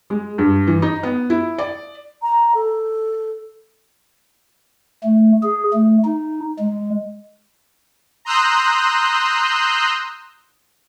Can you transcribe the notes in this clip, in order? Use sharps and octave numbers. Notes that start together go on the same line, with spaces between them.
G#3
G2
E3
D#4
B3
E4
D5
A#5
A4
A3
G#4
A3
D#4
G#3
A#5 C6 D#6 E6 F#6 G6